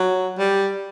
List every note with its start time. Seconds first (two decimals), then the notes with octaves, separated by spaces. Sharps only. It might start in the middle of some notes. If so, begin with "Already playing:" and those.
Already playing: F#3
0.39 G3